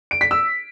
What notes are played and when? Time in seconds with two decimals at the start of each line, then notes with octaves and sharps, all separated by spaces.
0.11 D7
0.21 B6
0.31 E6